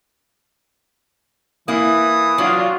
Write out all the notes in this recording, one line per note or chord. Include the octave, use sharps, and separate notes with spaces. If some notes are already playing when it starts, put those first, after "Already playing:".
E3 A#3 E4 D#6
F#3 D4 F4 F#4